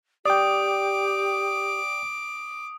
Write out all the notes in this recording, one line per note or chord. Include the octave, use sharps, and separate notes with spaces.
G4 D5 G5 D6 D#6